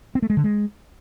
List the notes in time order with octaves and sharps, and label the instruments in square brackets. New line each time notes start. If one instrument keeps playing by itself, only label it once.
[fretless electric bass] C4
A3
G#3
D3
G#3